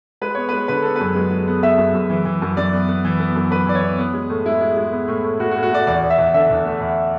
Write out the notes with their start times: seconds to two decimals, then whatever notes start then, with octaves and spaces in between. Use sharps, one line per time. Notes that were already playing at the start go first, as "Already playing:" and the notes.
0.21 G#3 B4
0.35 B3 C#5
0.49 B4
0.53 G#3
0.68 D3 B4
0.82 B3 A4
0.96 F#2 B4
1.15 G#3
1.31 G#3
1.48 B3
1.62 B3 E5
1.78 F#2
1.94 F#2
2.10 E3
2.25 E3
2.42 F#2
2.57 F#2 D5
2.73 B3
2.89 B3
3.05 E3
3.20 B3
3.36 F#2
3.51 F#2 B4
3.67 E3 D5
3.75 C#5
3.83 B3
3.98 B3
4.14 G#3
4.29 A2
4.46 G#3 E4
4.61 G#3
4.76 G#3
4.92 B3
5.08 A2
5.23 A2
5.39 A2 F#4
5.51 F#4
5.56 A2
5.63 F#4
5.72 A2 D5
5.87 E2 D5
6.02 E2
6.10 E5
6.18 E2
6.33 D3 E5
6.50 E2
6.66 A3
6.80 E2